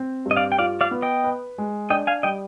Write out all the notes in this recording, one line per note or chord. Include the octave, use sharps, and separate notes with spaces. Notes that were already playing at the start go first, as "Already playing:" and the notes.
Already playing: C4
G2
D#5
D5 F5
G5
F4 D5 F5
D5 F5
B3
D#5 G5
B4
G#3
D4 D#5 G5
F5 G#5
G3 D#5 G5